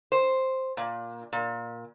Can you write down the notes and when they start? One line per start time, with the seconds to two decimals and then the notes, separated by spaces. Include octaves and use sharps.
0.12 C5
0.77 A#2
1.33 A#2